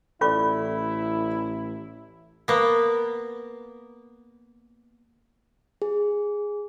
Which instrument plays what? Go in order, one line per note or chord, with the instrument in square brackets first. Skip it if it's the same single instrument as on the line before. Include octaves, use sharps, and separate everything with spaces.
[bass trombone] A1 [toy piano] C#4 F4 C#6 [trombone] E4 [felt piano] A4 D5
[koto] A#3 B3
[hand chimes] G#4